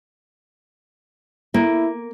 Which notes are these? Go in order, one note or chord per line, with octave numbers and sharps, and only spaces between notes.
A#3 E4